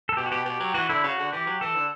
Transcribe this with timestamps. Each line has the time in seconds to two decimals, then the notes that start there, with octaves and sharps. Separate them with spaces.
0.09 A4
0.17 B2 G4
0.26 F#4
0.31 B2 G4
0.45 B2 G4
0.60 F#3
0.74 E3 F#4
0.89 D3 E4
1.03 C#3 F#4
1.19 D3
1.32 E3 G4
1.46 F#3
1.61 E3 A4
1.75 D3